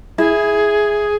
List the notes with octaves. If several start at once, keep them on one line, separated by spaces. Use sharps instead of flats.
E4 G#4